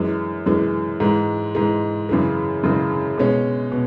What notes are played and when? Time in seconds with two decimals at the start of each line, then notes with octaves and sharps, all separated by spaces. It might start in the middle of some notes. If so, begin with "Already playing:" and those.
Already playing: F#2 E3 G#3
0.46 F#2 E3 G#3
1.00 G#2 E3 G#3
1.55 G#2 E3 G#3
2.09 F#2 C#3 E3 G#3
2.63 F#2 C#3 E3 G#3
3.18 B2 G#3 C#4
3.72 B2